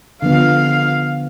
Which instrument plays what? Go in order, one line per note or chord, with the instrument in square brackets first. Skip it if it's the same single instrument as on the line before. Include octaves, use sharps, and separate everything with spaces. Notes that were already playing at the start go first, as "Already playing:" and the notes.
[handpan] D3 F3 B3 [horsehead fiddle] F5